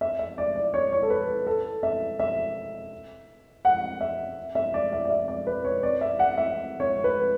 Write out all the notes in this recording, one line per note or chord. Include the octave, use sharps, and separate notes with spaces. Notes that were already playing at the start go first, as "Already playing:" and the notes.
E5
E5
D5
D5
C#5
C#5
A4
B4
A4
E5
E5
F#5
E5
E5
D5
E5
D5
E5
D5
B4
C#5
D5
E5
F#5
E5
C#5
B4